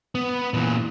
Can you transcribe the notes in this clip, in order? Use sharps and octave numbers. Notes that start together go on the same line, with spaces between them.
B3
A#2 E3